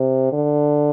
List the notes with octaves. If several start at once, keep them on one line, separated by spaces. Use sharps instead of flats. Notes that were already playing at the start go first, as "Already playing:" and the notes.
Already playing: C3
D3